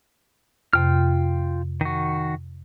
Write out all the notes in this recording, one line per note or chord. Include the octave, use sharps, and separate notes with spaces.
F2 C3 F4 G5 F6
D#3 F#4